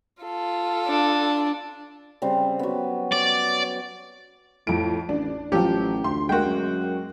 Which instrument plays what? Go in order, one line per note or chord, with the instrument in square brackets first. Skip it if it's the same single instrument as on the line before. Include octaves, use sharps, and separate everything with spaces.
[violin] F4 A4
[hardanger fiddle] D4
[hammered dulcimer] C#3 G3 C4
F#3 B3
[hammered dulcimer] C#5 [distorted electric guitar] D5
[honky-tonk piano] F2 D7 [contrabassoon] A2
[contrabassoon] A1 [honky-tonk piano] D4
[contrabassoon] A1 [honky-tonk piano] F3 F#3 [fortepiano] G4
[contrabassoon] D2 [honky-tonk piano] C6
[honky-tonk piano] G#3 A#3 [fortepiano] F#4 G5
[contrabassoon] F#2